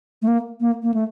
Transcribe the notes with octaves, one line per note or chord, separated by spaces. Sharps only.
A3
A#3
A#3
A#3
A3